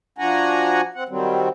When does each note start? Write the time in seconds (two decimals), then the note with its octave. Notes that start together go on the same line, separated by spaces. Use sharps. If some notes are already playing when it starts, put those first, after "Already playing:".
0.18 F3 D4 F#4 F#5 G#5 A#5
0.94 C4 F#5
1.09 D#3 F#3 G3 C4